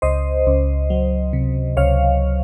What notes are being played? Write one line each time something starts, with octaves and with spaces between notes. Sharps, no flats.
C#2 C5 D#5
C#2
F#3
C3
C#2 C#5 F5